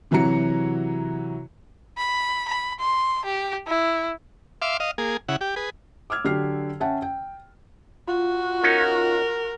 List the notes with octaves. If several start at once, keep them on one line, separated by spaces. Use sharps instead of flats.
C3 E3 F#3 F#4 A#5 C#7
B5
B5
C6
G4
E4
E5 F5 C6 D6
D#5 F5
A#3 G#4
C#3 E4 F#5
G4
G#4 B4
D6 E6 F6 G#6
D3 F#3 G4 F6 C7
C#4 E5 F#5 G5 A5
G5
F4 F#4
C#4 D#4 A#4